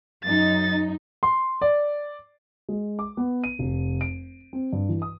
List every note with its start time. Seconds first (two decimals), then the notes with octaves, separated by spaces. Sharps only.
0.25 F#2 D#4 A6
1.23 C6
1.62 D5
2.69 G#3
2.99 D6
3.17 B3
3.44 D#7
3.59 F1
4.01 D7
4.53 C4
4.73 G2
4.89 E3
5.02 D#6